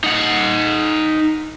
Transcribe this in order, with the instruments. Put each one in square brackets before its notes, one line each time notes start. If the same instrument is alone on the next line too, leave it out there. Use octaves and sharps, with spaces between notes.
[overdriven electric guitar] D#4 F#5